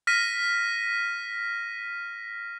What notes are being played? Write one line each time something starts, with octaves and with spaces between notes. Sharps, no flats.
F6 A#6 B6 D#7